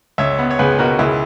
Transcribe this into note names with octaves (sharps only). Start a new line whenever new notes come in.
C#2 C#5 E5
B3
C#5
C#2 G#4 B4
B2 F#4 A#4
C#2 E4 G#4